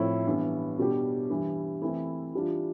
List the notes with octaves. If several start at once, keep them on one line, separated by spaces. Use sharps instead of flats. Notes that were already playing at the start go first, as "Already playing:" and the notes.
Already playing: A2 F3 C4 E4
G2 E3 B3
B2 G3 D4 G4
G2 E3 G3
E3 A3 C4 E4
E3 G3 D4 F4